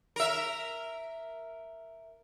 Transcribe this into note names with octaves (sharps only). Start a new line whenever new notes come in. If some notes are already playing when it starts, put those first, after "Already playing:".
A#4 E5